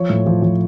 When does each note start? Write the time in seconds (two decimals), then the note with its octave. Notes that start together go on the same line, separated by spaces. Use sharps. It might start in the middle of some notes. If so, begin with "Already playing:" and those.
Already playing: F3 C#5
0.10 A2
0.27 F3
0.42 F3